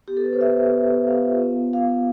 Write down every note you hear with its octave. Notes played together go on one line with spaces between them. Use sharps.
B3 G4
A4
B3 B4
C5
B3 E5
B3
B3
B3
B3 F5
F4
B3
F4
B3 F5
B3